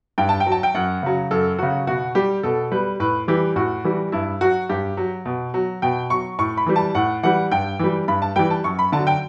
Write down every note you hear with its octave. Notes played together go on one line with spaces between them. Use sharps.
G2 G5
A5
G5
F#3
A5
G5
F#2 F#5
C#3 F#3
F#2 A4
C#3 F#3 F#4
B2 F#4
G3 G4
B2 A4
G3 B4
A2 B4
E3 G3 G4
A2 F#4
E3 G3
G2 E4
F#3 F#4
G2 G4
F#3
B2
F#3
B2 G5
F#3 C#6
A2 C#6
B5
E3 G3
A5
A2 F#5
E3 G3 F#5
G2 G5
E3 G3
G2 B5
A5
E3 G3 G5
A5
F#2 C#6
B5
D3 F#3 A5
G5